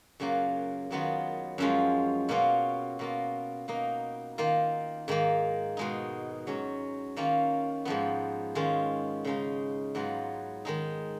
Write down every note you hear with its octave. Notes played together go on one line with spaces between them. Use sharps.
F#2 C#3 F#3 A#3 F4
F#2 D#3 F#3 B3 F4
F#2 F3 G#3 C#4 F4
B2 A#3 C#4 F4
B2 A#3 F4
B2 A#3 D#4
D#3 A#3 F4
G#2 D#3 A#3
B2 G#3 D#4
G#2 F#3 C#4
D#3 A#3 C#4 F4
G#2 F3 B3
D#3 G#3 C#4 F4
C#3 G#3 D#4
G#2 F#3 B3 F4
D#3 G#3 D#4